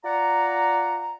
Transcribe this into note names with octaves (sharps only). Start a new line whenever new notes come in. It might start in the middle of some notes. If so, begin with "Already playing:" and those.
F4 D5 F#5 A#5